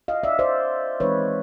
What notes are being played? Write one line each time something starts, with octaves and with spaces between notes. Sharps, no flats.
D#5 F5
D5 E5
C5 D5
E3 G#3 C4 D#4 B4 C#5